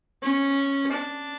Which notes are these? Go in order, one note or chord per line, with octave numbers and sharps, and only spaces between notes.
C#4
D4